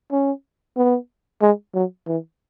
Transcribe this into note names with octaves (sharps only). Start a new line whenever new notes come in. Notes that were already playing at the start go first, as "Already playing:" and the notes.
C#4
B3
G#3
F#3
E3